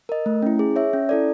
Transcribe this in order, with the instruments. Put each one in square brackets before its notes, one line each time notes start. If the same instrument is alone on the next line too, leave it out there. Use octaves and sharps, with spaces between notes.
[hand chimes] A#4 D#5
A3
C#4 E4
G#4
C#5 E5
C#4
E4 A4 D5